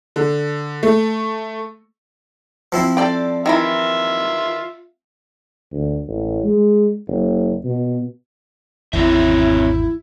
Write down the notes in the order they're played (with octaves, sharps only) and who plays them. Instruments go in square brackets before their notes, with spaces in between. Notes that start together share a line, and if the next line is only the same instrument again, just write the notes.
[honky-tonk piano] D3
A3
[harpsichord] F3 C4 E4
[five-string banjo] A4 D5 G5
[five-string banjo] D#3 E3 B5 [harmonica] F4 E5
[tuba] D2
A1
G#3
F#1
B2
[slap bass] G#1 E2 G#2 [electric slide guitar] C4 C#5 E5 [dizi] E4